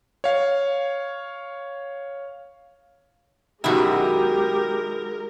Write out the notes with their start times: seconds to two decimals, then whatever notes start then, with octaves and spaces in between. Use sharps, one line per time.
0.24 C#5 F5
3.64 F#2 B2 D#3 G#3 E4 F#4 G4 A#4